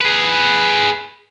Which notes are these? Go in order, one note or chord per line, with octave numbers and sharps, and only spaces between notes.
G#4 B4